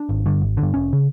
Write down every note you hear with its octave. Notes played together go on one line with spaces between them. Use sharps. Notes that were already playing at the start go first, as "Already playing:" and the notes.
Already playing: D4
G#1
G2 D3
G#1
D3
G2
F1 C#4
C#3